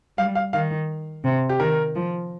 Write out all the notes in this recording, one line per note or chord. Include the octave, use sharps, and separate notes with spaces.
G3 F5
F5
D#3 F5
C3
G4
D#3 A#4
F3